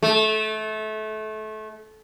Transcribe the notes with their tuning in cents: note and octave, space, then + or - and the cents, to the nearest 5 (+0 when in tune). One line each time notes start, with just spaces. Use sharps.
A3 -25